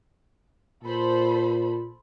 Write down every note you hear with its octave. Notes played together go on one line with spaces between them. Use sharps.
A#2 A4 C5 B5